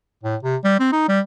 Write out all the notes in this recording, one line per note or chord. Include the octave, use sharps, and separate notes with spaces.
A2
C3
G3
C4
D#4
G3